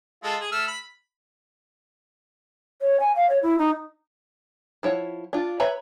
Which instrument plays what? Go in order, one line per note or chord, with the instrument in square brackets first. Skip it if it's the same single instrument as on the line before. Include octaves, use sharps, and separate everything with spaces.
[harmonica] G#3 F4 A4
G#4
A3 E6 F6
B5
[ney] C#5
G#5
F5
C#5
E4
D#4
[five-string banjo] F3 E4 C#5 F#5
D4 F4
B4 C#5 E5 A#5 B5